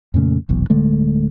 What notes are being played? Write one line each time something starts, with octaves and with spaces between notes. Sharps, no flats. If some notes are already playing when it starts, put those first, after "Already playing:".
F2 A#2 C#3 A3
F1 B1 E2
D1 D3 G#3 A3